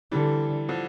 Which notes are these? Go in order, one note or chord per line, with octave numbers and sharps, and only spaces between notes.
D3 E3 G3
D3 F3